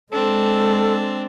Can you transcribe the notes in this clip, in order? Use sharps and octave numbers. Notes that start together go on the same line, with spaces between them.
G#3 C4 D4 A4